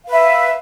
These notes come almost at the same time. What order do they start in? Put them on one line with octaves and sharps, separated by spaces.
F5 B4 E5